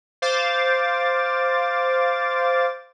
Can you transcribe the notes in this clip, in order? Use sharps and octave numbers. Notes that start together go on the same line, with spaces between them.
C5 F5 D6 A6